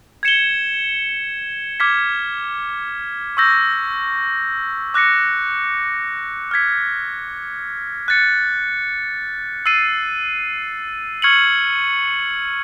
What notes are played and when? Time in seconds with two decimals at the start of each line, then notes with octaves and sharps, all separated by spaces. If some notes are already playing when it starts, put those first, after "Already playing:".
0.23 G#6 C#7 E7 G7
1.80 D6 F6 G#6 B6
3.37 C#6 E6 G6 A#6
4.94 D6 F#6 A#6 C#7
6.51 F6 G#6 B6
8.08 F#6 A6 C#7
9.66 E6 A6 C7 D#7
11.22 C#6 F6 G#6 C#7 F#7